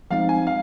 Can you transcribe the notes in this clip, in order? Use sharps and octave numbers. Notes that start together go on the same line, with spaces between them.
F3 G#3 C4 D#4 F5
G#5
F5